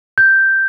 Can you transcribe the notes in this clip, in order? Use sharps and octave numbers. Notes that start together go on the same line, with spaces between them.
G6